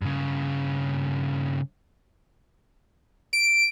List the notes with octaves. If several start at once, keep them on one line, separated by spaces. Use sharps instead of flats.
G2 C#3
D7